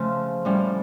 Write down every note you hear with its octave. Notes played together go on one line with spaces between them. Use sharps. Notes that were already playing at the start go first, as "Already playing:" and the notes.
Already playing: C#3 F3 A3 C#4
A2 G3 C#4